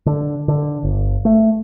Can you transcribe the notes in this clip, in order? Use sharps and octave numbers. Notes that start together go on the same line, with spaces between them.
D3
D3
G1
A3